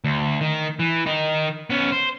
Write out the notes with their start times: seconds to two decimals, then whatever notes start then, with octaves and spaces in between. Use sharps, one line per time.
0.05 D2
0.41 D#3
0.79 E3
1.06 D#3 D#4
1.70 B3 C#4
1.92 C5